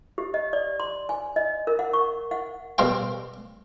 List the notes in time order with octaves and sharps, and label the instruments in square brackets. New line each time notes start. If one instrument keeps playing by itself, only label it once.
[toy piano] G4
D#5
D5
C6
G#5
D#5
A#4
F#5
C#6
F#5
[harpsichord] B2 G3 A#4 C5 F5 G5